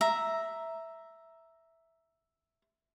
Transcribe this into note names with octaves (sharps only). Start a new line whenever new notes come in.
E5 A#5